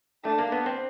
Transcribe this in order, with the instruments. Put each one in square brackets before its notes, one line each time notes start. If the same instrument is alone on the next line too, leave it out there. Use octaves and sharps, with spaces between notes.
[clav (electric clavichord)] A3 [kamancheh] D4
[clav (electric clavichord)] A#3
B3
C4